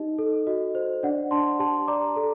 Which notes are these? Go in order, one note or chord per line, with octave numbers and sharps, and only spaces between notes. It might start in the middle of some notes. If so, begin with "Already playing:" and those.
Already playing: D#4 G4 D#5
A4
F#4 D#5
C5
D4 D5 F#5
D4 A5 C6
G4 A5 C6
D5 A#5 D6
A4